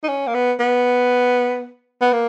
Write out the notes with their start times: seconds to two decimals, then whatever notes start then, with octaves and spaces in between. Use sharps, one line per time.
0.03 D#4
0.08 C#4
0.27 A#3
0.34 B3
0.59 B3
2.01 B3
2.13 A#3